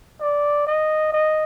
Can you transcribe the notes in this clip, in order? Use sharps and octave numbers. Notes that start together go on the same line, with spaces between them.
D5
D#5
D#5